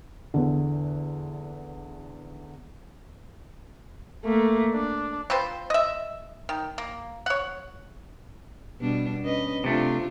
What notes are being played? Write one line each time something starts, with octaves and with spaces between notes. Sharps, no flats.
E2 D3
A3 A#3
D4
C4 F4 B4 C5
D#5 E5
D#3
A#3
C#5 F#5
B2 G3 D4
C#4 B4 D#5
C3 A3 C4 D4 F4